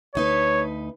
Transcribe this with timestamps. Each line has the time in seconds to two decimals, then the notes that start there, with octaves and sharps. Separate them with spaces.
0.15 D2 D#4 B4 C#5